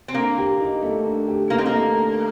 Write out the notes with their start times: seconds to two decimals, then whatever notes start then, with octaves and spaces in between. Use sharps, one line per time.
0.08 C4
0.14 D3 A#3
0.38 G4
0.60 D#4
0.83 A3
1.05 D3
1.27 G4
1.50 A#3 D#4
1.58 C4
1.66 A#3
1.73 A3
1.95 D3